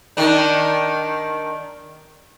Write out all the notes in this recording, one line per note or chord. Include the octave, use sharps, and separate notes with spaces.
D#3 D4